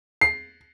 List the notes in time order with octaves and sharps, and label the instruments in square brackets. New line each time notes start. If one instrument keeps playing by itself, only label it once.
[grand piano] C7